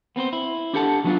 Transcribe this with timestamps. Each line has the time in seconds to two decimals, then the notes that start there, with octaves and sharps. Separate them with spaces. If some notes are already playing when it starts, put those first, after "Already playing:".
0.16 B3 C4 B4 C5
0.33 E4
0.74 D4 E4 G4 A4 F#5 A5
1.04 F3 F#3 B3 C4 D4 F4